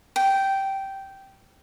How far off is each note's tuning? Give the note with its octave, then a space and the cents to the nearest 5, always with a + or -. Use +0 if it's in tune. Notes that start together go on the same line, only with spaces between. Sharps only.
G5 -10